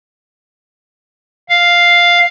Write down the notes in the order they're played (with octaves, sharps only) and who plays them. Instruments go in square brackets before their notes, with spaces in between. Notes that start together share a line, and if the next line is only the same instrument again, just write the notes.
[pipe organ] F5